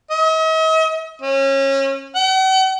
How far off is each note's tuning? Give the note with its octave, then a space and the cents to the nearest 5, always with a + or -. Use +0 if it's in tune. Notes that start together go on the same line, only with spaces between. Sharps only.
D#5 +45
C#4 -25
F#5 +45